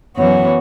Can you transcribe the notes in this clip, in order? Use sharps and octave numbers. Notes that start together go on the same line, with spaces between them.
F#2 E3 B3 F#4 C#5